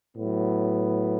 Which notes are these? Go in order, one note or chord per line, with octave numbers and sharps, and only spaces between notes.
A2 F#3 B3